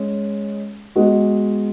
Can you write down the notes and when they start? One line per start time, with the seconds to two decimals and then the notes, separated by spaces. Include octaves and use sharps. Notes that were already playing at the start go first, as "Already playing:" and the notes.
Already playing: G#3 C#4
0.96 G#3 B3 F#4